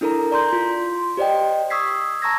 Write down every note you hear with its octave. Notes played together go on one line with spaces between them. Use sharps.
D4 E4 A4 A#4 A#5
D5 A#5 C6 G6
F4 C6
G4 C5 D5 D#5 G5
C#6 D#6 E6 G#6 B6 C7
A5 A#5 C#6 E6 G#6 A#6